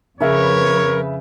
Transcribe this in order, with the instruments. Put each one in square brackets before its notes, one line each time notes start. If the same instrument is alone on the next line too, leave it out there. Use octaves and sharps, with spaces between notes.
[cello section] F2 B4 [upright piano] C#3 E5 [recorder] A#4 [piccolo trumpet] C#5